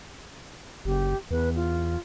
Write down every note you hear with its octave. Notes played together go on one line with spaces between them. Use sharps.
F#1 G4
E2 B4
F4